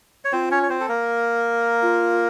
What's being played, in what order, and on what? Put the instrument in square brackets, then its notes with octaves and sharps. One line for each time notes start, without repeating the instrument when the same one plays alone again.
[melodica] C#5
[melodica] C4 C5 [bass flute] F4
[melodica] C#4 C#5
C#5
C4 C5
A4
A#3 A#4
[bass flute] F4